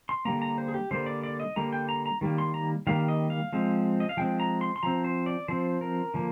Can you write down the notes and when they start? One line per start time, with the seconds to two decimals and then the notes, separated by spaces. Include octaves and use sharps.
0.09 C6
0.25 D3 G3 A#3 A#5
0.42 A#5
0.58 C5
0.68 G#4
0.74 G4
0.91 D3 G3 A#3 C5
1.06 D5
1.23 D5
1.40 D#5
1.56 D3 G3 A#3 A#5
1.73 G5
1.89 A#5
2.06 A#5
2.21 D#3 G3 A#3
2.38 C6
2.54 A#5
2.87 D#3 G3 A#3 F5
3.09 D#5
3.30 F5
3.53 F3 G#3 C4
4.00 D#5
4.09 F5
4.17 F3 G#3 C4 G5
4.40 A#5
4.61 C6
4.76 C6
4.83 F3 C4 A#5
5.04 C5
5.26 D5
5.48 F3 C4 C5
5.81 A#4
6.14 D3 F3 A#3